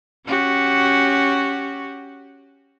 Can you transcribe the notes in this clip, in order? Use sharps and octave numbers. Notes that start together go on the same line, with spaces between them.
C#4 F#4 G4